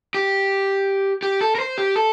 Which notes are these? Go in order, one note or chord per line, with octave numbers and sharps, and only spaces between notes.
G4
G4
A4
A#4
C5
G4
A4